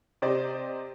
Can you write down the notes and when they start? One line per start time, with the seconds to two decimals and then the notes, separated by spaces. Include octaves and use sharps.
0.22 C3 G4 C5 D5 D#5